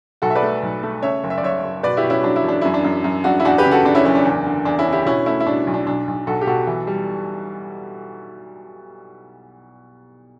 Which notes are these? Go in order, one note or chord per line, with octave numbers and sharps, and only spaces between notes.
B1 F#4 A4
E5
B4 D5
A3
B1
A3
C#3 C#5 E5
F#1
E5
D5
F#1 C#5 E5
F#1
B2 B4 D5
E4 G4
B2
C#4 E4
F#3 D4
E4
E1 D4
F#2 E4
D4
F#2
F#2
F#2 D4 F#4
E4
E2 D4 F#4
G4 B4
C#3
F#4 A4
C#3 D4
C#4 E4
F#1 C#4
D4
E2
D3
E2 D4
C#4 E4
D3
E4 G4
B2 C#4 E4
A3 C#4 E4
E4
B2 D4
B1
D4
B1 D4
B1
B1 F#4 A4
G4
B2 F#4 A4
E3
G3